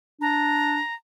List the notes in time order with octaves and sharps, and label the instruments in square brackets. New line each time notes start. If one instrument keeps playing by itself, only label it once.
[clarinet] D4 [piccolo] A#5